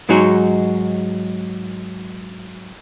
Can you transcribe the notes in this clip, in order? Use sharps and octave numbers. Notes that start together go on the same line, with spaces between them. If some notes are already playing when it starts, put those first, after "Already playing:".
G#2 F#3 G#3 D#4 F#4